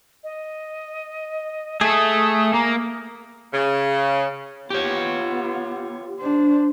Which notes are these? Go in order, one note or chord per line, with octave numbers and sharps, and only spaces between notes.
D#5
A3 G#4 A4 D#6
A#3 A#5
C#3
B3 F4 G4 C#5
D4 C5